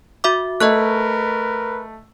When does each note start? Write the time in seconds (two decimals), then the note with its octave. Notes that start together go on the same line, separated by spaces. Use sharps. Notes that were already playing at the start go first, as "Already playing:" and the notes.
0.24 F#4 E5 D6
0.60 A3 A#4 B4 D#5 C#6 F#6